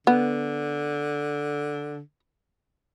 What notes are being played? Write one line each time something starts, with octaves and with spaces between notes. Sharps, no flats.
D3 B3